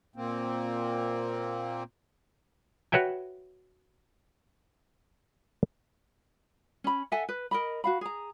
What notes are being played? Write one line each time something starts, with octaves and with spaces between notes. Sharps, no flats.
A#2 A#3 C4
F#4 B4 C#5 E5 G5 G#5
C#4 B5
A4 E5 F#5 G#5
B4
A#4 D#5 B5
F#4 F5 B5
G#4 A#5